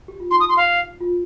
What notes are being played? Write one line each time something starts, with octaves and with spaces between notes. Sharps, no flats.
G4
F4
D#4 C6
D#6
C6
F5
F4